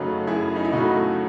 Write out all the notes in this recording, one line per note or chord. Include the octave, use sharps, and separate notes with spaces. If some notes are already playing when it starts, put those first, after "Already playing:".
Already playing: F#2 C#3 F#3 A3 D#4 F#4
F#2 E4 G#4
D#4
E4
C#3 F#3 A3 D#4 F#4